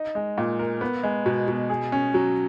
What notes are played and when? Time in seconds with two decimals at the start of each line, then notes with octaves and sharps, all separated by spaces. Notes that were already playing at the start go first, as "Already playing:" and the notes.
Already playing: D#4
0.15 G#3
0.38 A#2
0.59 A#4
0.81 B3
1.03 G#3
1.26 B2
1.48 B2
1.70 G#4
1.92 C#4
2.14 F#3